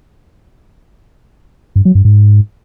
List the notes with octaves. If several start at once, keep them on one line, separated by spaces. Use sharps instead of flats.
G2
F#3
G2
G#2